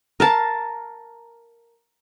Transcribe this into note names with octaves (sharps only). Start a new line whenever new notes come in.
A#4 F5 A5